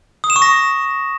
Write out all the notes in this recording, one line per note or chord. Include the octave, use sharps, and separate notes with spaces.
D#6
E7
C#6
A#6